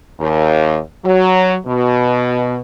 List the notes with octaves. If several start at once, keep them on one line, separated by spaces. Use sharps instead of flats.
D#2
F#3
B2